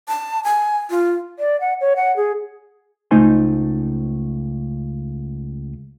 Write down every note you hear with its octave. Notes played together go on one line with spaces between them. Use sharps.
A5
G#5
F4
D5
F#5
C#5
F#5
G#4
C#2 A3 D#4 C5 G#5 C6